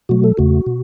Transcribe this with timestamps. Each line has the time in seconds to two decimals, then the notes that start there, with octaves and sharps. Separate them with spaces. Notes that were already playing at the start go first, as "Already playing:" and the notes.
0.09 B2 F#3 A3 F#4
0.24 A4
0.37 E2 C#3 A3 F#4
0.66 B2